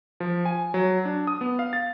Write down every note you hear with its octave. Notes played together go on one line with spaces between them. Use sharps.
F3
G#5
F#3
D4
D#6
B3
F5
A6